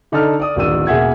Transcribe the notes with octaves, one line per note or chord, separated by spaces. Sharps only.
D3 D#4 A4 D5 A5 F6
D5 D#6
D1 A1 D#3 D5 E6 D#7
E1 A#3 G#4 E5 F#5 G#6